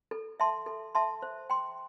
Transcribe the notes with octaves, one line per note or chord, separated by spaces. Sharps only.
A4
E5 A5 C6
A4
E5 A5 C6
C5
G5 C6